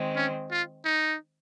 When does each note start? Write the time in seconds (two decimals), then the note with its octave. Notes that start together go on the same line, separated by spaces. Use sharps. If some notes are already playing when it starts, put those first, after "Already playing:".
Already playing: D#3 G#3 C4
0.16 C#4
0.51 F4
0.85 D#4